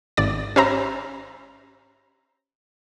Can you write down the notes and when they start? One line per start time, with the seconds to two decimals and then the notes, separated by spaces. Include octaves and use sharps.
0.17 G#1 D5 A6
0.56 C#4 G4 C5 E5 A#5 B5